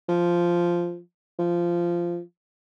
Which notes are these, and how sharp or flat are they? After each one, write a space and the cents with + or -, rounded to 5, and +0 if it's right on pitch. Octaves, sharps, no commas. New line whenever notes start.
F3 -5
F3 -15